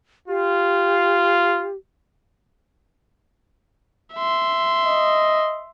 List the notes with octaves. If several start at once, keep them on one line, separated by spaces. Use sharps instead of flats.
F4 G4
E5 C6
D#5